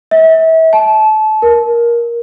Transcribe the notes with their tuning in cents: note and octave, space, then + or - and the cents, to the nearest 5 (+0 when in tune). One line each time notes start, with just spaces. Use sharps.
E5 -35
A5 -25
A#4 +15